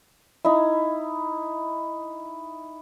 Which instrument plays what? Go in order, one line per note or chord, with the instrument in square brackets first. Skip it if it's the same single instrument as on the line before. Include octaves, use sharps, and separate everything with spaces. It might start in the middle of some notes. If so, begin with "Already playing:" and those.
[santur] D#4 E4